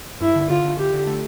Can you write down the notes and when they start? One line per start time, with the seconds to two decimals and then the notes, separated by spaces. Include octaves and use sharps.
0.21 G2 E4
0.35 D3
0.49 D3 F4
0.64 D3
0.78 D3 G4
0.93 D3
1.07 A3